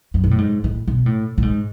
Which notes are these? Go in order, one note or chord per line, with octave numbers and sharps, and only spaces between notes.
F#2
B2
A2
G#2
A2
B2
A2
A2
G#2